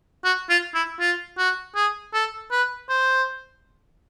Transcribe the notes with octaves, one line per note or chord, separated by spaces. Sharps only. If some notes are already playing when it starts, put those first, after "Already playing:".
F#4
F4
E4
F4
F#4
G#4
A4
B4
C5